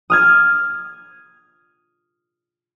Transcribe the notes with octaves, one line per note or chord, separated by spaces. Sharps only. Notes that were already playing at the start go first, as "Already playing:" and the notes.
D#6 F6 G#6